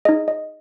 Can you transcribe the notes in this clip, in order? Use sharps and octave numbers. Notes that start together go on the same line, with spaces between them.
D#4 G#4 D#5
D#5